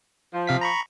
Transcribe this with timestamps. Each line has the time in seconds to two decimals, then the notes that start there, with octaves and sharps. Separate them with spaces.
0.34 F3
0.47 C3 F5 B6
0.61 A#5 B5 C#6